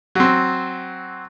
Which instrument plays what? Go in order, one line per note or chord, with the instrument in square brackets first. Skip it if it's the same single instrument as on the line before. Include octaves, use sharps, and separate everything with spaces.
[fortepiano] F#3 C4